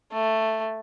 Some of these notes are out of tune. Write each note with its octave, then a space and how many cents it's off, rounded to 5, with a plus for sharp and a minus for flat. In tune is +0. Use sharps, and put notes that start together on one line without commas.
A3 +5